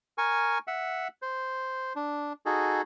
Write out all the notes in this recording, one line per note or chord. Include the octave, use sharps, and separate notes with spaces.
A#4 G#5 C#6
E5 F#5
C5
D4
D#4 F#4 G#4 A4